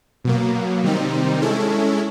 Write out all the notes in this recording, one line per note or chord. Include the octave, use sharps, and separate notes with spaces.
B2 F#3 A#3
C3 D#3 G3 C4 D#4
G#3 C#4 E4 A4